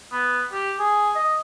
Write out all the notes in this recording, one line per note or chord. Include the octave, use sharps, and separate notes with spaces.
B3
G4
G#4
D#5